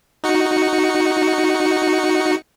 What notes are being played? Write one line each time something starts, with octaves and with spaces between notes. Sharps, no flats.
D#4 F#4 C#7